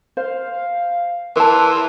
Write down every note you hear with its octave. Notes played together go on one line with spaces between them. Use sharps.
C5 F5
E3 A#4 B4 A5 C6